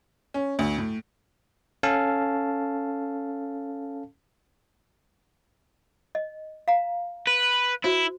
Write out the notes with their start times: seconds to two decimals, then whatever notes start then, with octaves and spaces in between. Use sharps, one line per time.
0.34 C#4
0.59 D2
0.78 A2
1.83 C#4 A4 F5 A5
6.15 D#5
6.68 F5 A#5
7.27 B4
7.84 E4 F#4 C5